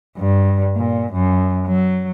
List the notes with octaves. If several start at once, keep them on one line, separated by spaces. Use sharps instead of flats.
G2
A#2
F#2
F#3